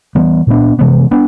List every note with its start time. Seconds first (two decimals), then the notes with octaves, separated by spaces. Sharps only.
0.15 E3 G3 B3
0.47 A#2 G3 B3 D4
0.79 C3 E3 G#3 B3
1.11 B3 D4